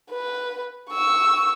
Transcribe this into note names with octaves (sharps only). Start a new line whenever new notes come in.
B4
C#6 E6